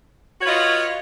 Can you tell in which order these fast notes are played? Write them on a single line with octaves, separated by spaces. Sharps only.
F#4 C#5 F4 B4 D#5